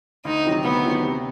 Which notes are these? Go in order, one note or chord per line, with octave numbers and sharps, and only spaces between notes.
D2 D#4
C3 D#3 F#3
D2 B3
C3 D#3 F#3
C3